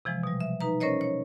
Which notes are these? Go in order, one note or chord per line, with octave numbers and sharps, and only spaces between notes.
C3 E3 F3 G#3
B2 G3
E5
D#4 B4 A#5
C#4 A#4 C5 C#5 D#5
C#5